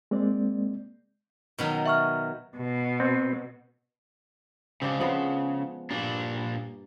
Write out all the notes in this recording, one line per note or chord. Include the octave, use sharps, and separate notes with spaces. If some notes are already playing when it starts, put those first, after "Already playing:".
G#3 A#3 C4 D5
B2 D#3 F#3
E5 C#6 F6
B2
C4
C#2 C#3 C4 D4 G4
C#3 F3 G#3 B3
G2 A#2 A#3 D4